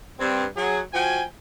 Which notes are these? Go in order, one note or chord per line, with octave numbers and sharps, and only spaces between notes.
G2 C4
F#3 G#4
F3 F#4 G5 G#5